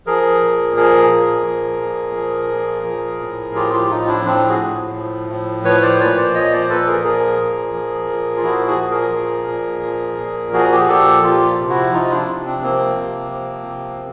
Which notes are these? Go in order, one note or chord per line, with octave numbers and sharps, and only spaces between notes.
F3 G#4 A#4
A#2
F3 G#4 A#4
A#2
F3
A#2
F3
A#2
F3
A2
F3 F4 G4
F4 G4
A2 D#4 F4
D4 E4
F3 C4 D4
F#4 G#4
A2
F3
A2
F3 B4 C#5
C5 D5
A#2 B4 C#5
C5 D5
F3 C#5 D#5
C5 D5
A#2 A4 B4
G#4 A#4
F3 G#4 A#4
A#2
F3
A#2
F4
F3 E4 F#4
F#4 G#4
A#2
G#4 A#4
F3
A#2
F3
A#2
F3 F#4 G#4
G4
G#4
A#2 G4 A4
F3 F4 G4
C3
E4 F#4
F3 D#4 F4
D4 E4
C3
C4 D4
F3 A#3 C4
C3
F3
C3